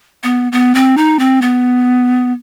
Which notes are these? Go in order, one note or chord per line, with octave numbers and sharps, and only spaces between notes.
B3
B3
C4
D#4
C4
B3